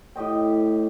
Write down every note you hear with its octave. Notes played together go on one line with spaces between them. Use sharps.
A2 G4 D#5 G5